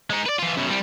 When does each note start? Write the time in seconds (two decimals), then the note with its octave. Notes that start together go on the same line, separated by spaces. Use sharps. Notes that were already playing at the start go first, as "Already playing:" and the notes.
0.10 G#3 D#4
0.26 B4 D5
0.38 E3 F4
0.57 F#2 B2
0.69 C2 G3